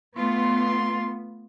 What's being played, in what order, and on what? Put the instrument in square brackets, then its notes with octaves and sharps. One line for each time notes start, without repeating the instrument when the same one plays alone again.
[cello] A3 F4 [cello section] B3 [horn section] C6